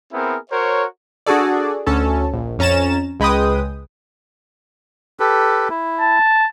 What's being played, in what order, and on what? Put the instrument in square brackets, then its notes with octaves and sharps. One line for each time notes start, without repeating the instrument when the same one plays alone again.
[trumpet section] B3 C4 E4 G#4 A#4
F#4 A#4 C5 C#5
[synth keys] D4 F#4 G#4 A4 D5
D2 C#4 A4 A5
A#1
F2 C#4 A#5 A6 E7
C#2 G#3 B4 G5 D#6
[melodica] G4 A4 B4
E4
[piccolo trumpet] A5